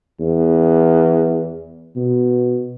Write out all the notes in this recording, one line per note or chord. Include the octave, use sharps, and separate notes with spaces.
E2
B2